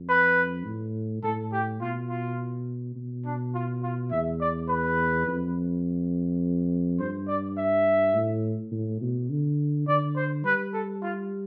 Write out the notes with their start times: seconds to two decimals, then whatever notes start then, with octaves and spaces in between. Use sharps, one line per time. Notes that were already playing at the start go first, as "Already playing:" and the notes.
Already playing: F2
0.09 B4
0.66 A2
1.23 A2 A4
1.53 G4
1.81 B2 F4
2.10 F4
2.96 B2
3.25 D4
3.55 F4
3.83 F4
4.11 E2 E5
4.41 D5
4.69 B4
5.27 F2
7.00 G2 C5
7.28 D5
7.58 E5
8.14 A2
8.72 A2
9.01 B2
9.30 D3
9.88 D3 D5
10.16 C5
10.45 G3 B4
10.73 A4
11.03 F4